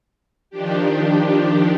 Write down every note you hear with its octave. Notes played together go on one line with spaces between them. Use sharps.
D#3 F3 D4 G4